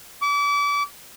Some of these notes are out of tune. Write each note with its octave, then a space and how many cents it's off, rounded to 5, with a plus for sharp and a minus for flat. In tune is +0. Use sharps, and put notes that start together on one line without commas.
D6 -35